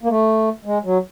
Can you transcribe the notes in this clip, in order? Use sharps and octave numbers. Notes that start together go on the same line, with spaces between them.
A#3
A3
G#3
F#3